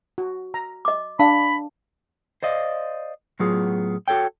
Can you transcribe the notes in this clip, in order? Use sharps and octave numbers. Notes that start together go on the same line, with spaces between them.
F#4
A#5
D#5 D6
D4 F5 A5 B5
C5 D5 D#5 F5
A2 F#3 B3 F4 G#4
F#4 A4 C#5 G5